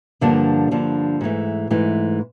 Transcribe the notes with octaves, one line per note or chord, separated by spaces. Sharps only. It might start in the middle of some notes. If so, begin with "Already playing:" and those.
G2 D3 F3 A#3 D4
G2 D3 F3 A#3 D4
G#2 E3 A3
G#2 E3 A3